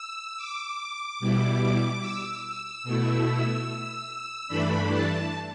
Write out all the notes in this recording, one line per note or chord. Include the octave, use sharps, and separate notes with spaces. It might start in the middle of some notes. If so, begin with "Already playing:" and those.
Already playing: E6
D6
B2 G3 E4
E6
E6
B2 A3 E4
G2 E3 A3 D4 B5
A5